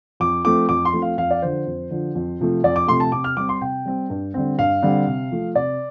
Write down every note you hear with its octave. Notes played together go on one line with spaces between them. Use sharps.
F2 D6
F3 A3 C4 D6
F2 D6
C6
F3 A3 C4
F5
F2 F5
D5
D3 F3 C5
F2
D3 F3
F2
C3 F3 A3
F2 D5
D6
C3 F3 A3 C6
A5
C3 D6
F6
G3 C4 D6
C6
C3 G5
G3 C4
G2
D3 G3 C4
G2 F5
D3 G3 C4
C3
F3 A3
C3 D5